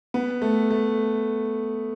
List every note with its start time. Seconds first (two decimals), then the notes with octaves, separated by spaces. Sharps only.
0.14 B3
0.42 A3
0.71 A3